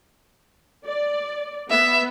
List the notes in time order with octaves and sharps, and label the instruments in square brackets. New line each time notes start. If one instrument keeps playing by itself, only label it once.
[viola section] D5
[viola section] B3 [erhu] E5